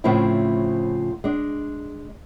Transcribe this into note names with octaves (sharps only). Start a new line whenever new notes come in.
A2 C#3 F3 A3 C4 E4
G#3 D4